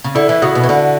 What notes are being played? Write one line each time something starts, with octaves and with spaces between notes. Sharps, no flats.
C#3
D3 E4
E3
C#3 F#4
B2
E3
D3